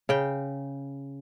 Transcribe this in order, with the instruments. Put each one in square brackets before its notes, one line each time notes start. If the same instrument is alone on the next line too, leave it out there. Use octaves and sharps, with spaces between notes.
[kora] C#3 G5